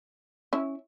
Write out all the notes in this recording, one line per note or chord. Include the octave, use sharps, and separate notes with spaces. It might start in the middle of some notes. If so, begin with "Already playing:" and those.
C#4 E4